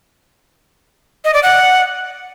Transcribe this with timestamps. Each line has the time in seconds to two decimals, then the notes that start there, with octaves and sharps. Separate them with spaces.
1.25 D#5
1.34 D5
1.43 F#5